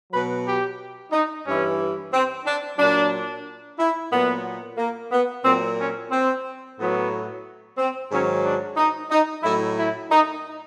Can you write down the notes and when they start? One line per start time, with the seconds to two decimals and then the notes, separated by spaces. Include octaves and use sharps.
0.12 B2 F#3 B4
0.46 G4
1.11 D#4
1.45 G2 E3 C#4
2.12 C4
2.46 D4
2.79 A#2 F#3 D4
3.78 E4
4.12 A#2 F#3 B3
4.78 A#3
5.11 B3
5.44 A#2 F#3 C4
5.78 C#4
6.11 C4
6.78 A2 F#3 B3
7.77 C4
8.10 G#2 D#3 F#3 C#4
8.44 D4
8.77 D#4
9.10 D#4
9.43 A2 F#3 E4
9.77 E4
10.10 D#4